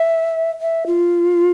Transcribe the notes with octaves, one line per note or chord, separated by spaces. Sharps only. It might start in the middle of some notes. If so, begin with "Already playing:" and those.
Already playing: E5
E5
F4